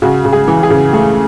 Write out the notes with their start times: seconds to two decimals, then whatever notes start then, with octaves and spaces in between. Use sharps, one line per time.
0.02 C#3 F#4
0.25 C#3
0.33 G#4
0.48 E3
0.63 G#4
0.70 C#3
0.93 A3 G#4